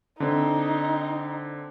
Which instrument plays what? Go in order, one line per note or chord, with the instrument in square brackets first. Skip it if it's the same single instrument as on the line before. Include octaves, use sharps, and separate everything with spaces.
[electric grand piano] D3 C4 [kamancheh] D#4